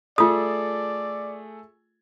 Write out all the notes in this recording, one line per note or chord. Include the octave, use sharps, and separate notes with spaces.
A3 F4 G#4 A4 D5 D#6